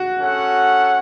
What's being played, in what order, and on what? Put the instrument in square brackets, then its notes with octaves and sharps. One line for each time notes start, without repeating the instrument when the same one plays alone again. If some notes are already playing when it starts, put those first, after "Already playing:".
Already playing: [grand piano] F#4
[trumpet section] C#4 A4 F#5